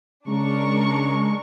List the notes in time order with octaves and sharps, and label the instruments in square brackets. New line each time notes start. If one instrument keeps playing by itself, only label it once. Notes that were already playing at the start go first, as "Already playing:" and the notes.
[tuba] C#3 [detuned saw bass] G#3 [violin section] D4 A#4 C#6